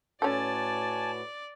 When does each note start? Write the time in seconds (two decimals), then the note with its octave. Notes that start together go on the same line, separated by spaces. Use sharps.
0.22 A2 C#4 F#4 A4 B4 D5 G#5 A5